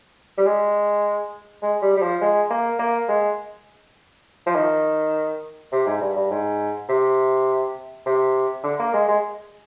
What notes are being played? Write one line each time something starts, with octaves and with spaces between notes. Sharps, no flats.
G3
G#3
G#3
G3
G3
F3
G#3
A#3
A#3
G#3
F3
D#3
C3
G#2
G2
G2
G#2
C3
C3
D3
A#3
G#3
G#3